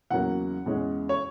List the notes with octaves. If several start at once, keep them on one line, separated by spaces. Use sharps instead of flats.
E2 C#3 F#3 A#3 F#5
E2 C#3 G#3 C#4
C#5